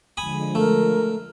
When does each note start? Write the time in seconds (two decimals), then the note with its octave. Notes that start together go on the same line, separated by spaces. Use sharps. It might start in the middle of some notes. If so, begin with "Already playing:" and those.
0.17 D3 F3 G#3 G#5 B5 D#6
0.55 A3 A#4